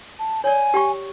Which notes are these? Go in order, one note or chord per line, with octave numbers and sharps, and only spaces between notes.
A5
C#5 D5 G#5
G4 G5 C#6